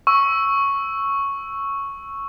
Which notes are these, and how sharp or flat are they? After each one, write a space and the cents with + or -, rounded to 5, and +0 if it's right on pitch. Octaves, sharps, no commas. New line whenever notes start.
C#6 +0 E6 +0